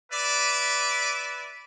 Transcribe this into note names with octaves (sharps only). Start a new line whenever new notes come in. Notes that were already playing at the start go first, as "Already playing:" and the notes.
B4 D5 E5